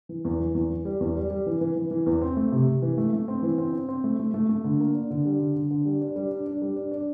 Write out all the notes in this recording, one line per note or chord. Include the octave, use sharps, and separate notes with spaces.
E3
E2
E3
E2
E3
G3
E2
G3
G3
E3
E3
E3
E3
E2
C4
A3
C3
C3
E3
A3
A3
C4
E3
C4
C4
C4
A3
A3
A3
A3
D3
A#3
D4
D3
G3
D3
D3
D3
G3
D4
G3
D4
D4
G3
D4
D4